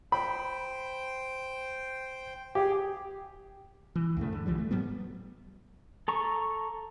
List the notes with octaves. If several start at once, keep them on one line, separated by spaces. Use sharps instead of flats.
C5 G5 B5
G4 G#4
E3
D2 G2 C#3 A3
D3
B1 E3 F3 G3
A3
G#2 F#3 G3 B3
A4 A#5 C#6